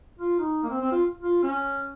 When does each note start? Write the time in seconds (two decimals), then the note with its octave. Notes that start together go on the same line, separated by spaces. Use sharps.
0.19 F4
0.39 D#4
0.63 A#3
0.70 C4
0.81 C4
0.92 F4
1.22 F4
1.43 C#4